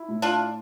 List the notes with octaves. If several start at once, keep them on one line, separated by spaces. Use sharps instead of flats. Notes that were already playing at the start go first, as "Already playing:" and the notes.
Already playing: E4
A2
D4 F4